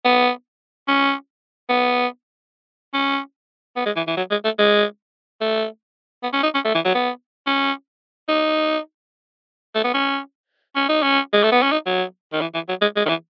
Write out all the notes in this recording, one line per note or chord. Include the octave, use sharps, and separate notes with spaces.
B3
C#4
B3
C#4
B3
G#3
E3
E3
F#3
G#3
A3
G#3
A3
B3
C#4
D#4
C#4
A3
E3
F#3
B3
C#4
D#4
A3
B3
C#4
C#4
D#4
C#4
G#3
A3
B3
C#4
D#4
F#3
D#3
E3
E3
F#3
G#3
G#3
D#3
E3